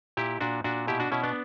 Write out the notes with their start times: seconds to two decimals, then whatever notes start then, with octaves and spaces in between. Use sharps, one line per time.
0.17 A#2 E4 G4
0.41 A#2 D4 F#4
0.64 A#2 D4 F#4
0.88 B2 E4 G4
1.00 D4 F#4
1.12 B2 C#4 E4
1.24 B3 D4